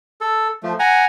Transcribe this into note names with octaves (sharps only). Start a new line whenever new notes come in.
A4
F3 A3
F#5 G#5 A#5